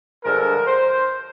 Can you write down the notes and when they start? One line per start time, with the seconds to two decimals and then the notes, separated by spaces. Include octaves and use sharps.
0.24 G2 D3 F3 G#3 A#4
0.67 C5